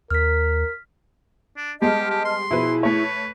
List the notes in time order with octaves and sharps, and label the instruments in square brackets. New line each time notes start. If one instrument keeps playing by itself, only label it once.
[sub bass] D#2 [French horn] A#4 [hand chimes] F6 B6
[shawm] D4
[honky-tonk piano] G3 G#3 B3 [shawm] G4 [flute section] D#5 A5 F6
[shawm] G4
C6
[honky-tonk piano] B2 F3 B4 [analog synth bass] E4 [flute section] G#4
[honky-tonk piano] A3 C#5 [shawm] B4